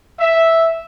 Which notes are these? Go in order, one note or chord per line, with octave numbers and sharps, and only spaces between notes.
E5